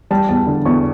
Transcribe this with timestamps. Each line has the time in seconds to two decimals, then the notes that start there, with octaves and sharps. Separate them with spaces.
0.11 G3 A5
0.29 E2 A5
0.47 D3
0.66 E2 C#6